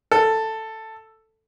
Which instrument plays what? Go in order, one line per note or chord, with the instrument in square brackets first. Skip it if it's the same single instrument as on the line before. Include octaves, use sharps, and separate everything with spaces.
[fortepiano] A4